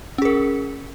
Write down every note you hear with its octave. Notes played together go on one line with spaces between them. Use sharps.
C#4 G#4 A#4